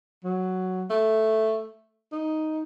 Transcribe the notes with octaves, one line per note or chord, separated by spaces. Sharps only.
F#3
A3
D#4